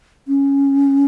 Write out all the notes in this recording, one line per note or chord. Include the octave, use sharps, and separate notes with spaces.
C#4